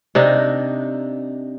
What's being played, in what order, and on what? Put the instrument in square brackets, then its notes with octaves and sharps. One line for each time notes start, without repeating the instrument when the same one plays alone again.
[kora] C3 D4 D#4